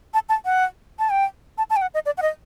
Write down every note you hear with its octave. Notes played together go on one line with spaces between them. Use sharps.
A5
A5
F#5
A5
G5
A5
A5
G5
F#5
D#5
D5
F#5
D#5